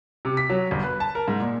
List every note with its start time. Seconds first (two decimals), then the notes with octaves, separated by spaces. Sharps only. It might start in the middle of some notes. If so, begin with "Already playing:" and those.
0.25 C3
0.37 B6
0.50 F#3
0.71 G1
0.83 B4
1.00 A5
1.15 A#4
1.28 G#2
1.40 A#2